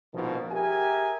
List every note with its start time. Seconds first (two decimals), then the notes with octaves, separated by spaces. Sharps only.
0.13 A#1 G#2 B2 D#3 F3
0.52 G4 G#4 A#4 E5 G#5